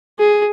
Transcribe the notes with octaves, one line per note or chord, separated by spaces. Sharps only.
G#4